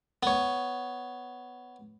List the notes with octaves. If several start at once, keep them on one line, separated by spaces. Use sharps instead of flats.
B3 C#5